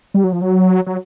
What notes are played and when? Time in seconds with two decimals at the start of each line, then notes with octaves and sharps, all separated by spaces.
0.14 G3
0.24 F#3
0.32 F3
0.42 F#3
0.86 F#3